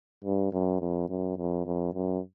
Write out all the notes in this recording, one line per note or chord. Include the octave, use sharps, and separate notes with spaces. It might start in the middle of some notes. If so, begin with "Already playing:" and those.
G2
F#2
F2
F#2
F2
F2
F#2